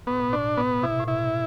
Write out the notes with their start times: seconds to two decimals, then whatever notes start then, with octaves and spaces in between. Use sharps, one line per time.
0.07 A2 B3
0.20 B2
0.32 A2 D4
0.57 B3
0.78 C3
0.83 B2 E4
1.00 A2
1.08 B2 E4